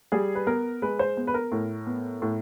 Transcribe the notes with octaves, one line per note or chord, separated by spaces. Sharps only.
G3 G#4
B4
B3 A#4
G#3 B4
C5
B3
B4
A#4
A2
B3
A2